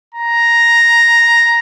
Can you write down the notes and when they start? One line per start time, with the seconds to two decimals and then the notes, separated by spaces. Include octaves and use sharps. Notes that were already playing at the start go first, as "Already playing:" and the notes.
0.15 A#5